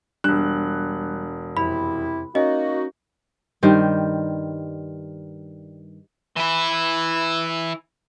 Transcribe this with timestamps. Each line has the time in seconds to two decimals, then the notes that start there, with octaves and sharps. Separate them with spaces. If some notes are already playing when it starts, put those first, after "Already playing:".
0.24 E1 G3 D4 F#6
1.57 F2 C3 E4 B5
2.35 A#3 C#4 D#4 F#4 D#5
3.63 G2 D#3 G3 C5
6.36 E3 E4